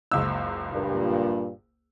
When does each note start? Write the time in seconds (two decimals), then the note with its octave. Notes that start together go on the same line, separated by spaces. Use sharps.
0.12 F#1 C#2 E6
0.71 G2 A#2